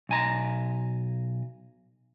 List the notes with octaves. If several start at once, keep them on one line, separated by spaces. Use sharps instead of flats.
B1 G#5 A#5